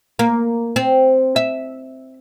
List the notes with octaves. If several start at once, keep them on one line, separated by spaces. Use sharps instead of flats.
A#3
C4
E5